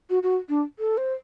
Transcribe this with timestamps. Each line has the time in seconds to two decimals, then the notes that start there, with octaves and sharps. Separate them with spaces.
0.10 F#4
0.23 F#4
0.49 D4
0.79 A4
0.97 C5